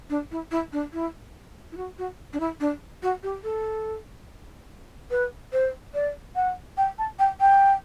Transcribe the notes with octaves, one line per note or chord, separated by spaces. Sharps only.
D4
E4
E4
D4
E4
E4
F#4
F#4
D4
E4
D4
F#4
G4
A4
B4
C5
D5
F#5
G5
A5
G5
G5